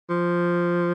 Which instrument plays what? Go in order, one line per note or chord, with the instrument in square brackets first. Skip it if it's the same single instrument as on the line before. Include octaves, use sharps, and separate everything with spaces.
[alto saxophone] F3